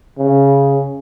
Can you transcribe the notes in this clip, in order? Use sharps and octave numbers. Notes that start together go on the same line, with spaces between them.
C#3